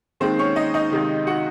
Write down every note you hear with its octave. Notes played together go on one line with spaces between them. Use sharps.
D#2 D#3 G#3 C4 C5
C#4 C#5
D#4 D#5
D#4 D#5
C#2 C3 D#3
F#4 F#5